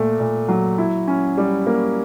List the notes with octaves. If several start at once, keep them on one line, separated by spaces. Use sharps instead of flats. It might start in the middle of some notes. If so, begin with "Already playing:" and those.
Already playing: A#2 A3
A#2
F#3
E4
C#4
G3
A#3